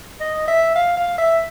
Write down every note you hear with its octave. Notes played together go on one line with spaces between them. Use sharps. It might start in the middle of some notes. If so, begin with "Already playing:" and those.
D#5
E5
F5
F5
E5